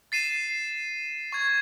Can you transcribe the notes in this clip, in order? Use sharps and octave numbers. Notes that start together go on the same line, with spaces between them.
A6 C7 D#7 E7
C#6 G#6